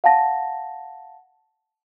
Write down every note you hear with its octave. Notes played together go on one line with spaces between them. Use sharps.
F5 F#5 A5 A#6